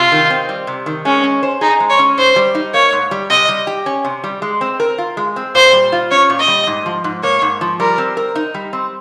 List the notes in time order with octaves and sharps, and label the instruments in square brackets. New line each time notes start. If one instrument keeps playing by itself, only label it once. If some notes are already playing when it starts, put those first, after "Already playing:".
Already playing: [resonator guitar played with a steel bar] C3 [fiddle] F4
[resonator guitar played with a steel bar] D#3
C4
G3
C3
D#3
[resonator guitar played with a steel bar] G#3 [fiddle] C#4
[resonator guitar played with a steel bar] C#4
C5
[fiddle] D#4 [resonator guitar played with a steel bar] G#4
[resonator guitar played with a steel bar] G#3
[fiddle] C#5
[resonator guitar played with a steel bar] C#4
[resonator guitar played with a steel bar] G#2 [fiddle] C5
[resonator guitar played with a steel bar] G3
D#4
[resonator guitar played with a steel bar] A#3 [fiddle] C#5
[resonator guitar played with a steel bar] G#2
G3
[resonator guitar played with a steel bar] C3 [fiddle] D#5
[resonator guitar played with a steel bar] G3
G4
C#4
C3
G3
G#3
C4
A#4
F4
G#3
C4
[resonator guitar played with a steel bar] A#2 [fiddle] C5
[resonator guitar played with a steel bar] G3
F4
[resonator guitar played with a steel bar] C#4 [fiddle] C#5
[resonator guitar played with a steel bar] A#2
[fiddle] D#5
[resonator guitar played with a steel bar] G3
G#2
F3
G#2
[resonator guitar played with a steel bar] A#3 [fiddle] C#5
[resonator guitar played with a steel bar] G#2
F3
[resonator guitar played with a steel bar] G3 [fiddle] A#4
[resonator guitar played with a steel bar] C4
A#4
D#4
G3
C4